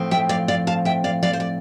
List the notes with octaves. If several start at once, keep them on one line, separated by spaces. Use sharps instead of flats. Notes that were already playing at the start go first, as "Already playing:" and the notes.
Already playing: A2 F3 C4
E5 G5
D5 F5
D5 F5
F5 A5
E5 G5
D5 F5
D5 F5
C5
D5